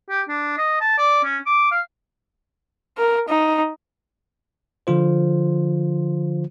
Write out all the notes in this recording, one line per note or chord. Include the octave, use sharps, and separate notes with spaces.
G4
D4
D#5
A5
D5
C#4
D6
F5
A#4
D#4
D3 F3 F4 C5